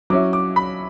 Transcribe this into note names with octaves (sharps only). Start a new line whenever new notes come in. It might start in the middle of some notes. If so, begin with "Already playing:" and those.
F#3 C#4 E4 D6
D6
B5